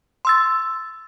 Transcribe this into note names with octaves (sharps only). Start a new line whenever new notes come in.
C6 E6 A6